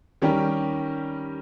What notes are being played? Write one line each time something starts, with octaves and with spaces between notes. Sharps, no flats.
D#3 G3 C#4 G4 A#4